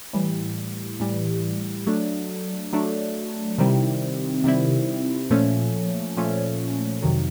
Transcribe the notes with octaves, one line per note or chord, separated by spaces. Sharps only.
A2 E3 G3
A2 E3 G3
F#3 A3 D4
F#3 A3 D4
C3 D#3 G3 C4 E4
C3 D#3 G3 C4 E4
A#2 F3 A3 C#4
A#2 F3 A3 C#4
F2 C3 D#3 F#3